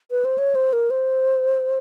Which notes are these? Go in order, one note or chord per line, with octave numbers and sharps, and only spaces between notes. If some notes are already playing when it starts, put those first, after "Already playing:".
B4
C5
C#5
C5
A#4
C5